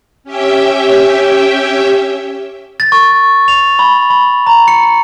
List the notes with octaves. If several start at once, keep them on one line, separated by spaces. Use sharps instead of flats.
C#4 G4 E5 G5
A6
C#6
F7
B5
B5
A#5
C#7